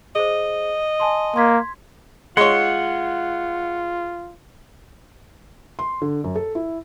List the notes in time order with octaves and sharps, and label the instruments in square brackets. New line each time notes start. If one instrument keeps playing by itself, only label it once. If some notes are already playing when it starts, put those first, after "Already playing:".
[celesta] G#4 C5 [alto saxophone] D#5
[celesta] G#5 A5 C6
[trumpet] A#3 [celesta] C6 G#6 B6
[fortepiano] G#3 C#5 [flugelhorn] F4 [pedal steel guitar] F#5 C6
[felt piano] C6
D3
F#2
A4
E4